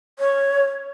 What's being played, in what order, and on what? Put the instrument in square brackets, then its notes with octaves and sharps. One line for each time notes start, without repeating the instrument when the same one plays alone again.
[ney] C#5